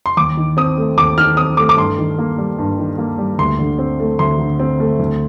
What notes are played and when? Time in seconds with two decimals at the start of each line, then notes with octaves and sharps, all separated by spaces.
0.06 C6
0.17 D#2 D6
0.37 D#3
0.57 C4 D#6
0.78 A3
0.98 D#2 D6
1.18 D#3 F6
1.37 C4 D#6
1.57 A3 D6
1.69 D6
1.77 G2 C6
1.98 D#3
2.18 A#3
2.38 G3
2.59 G2
2.78 D#3
2.98 A#3
3.18 G3
3.39 D2 C6
3.59 D3
3.79 C4
4.00 A3
4.19 D2 C6
4.39 D3
4.59 C4
4.80 A3
5.00 D2